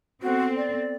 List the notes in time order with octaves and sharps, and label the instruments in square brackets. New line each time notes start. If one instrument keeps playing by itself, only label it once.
[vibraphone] B3 A4 [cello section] C4 [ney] F#4
[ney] D5